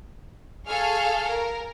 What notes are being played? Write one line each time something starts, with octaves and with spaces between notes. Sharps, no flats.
G#4 A4 F5 G#5 C#6 F6
A#4